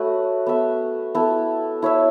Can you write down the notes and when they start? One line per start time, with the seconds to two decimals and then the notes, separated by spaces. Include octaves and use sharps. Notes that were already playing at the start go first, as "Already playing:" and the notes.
Already playing: A3 F#4 B4 C#5 E5
0.47 B3 A4 E5
1.15 B3 E4 A4
1.82 E4 C#5 E5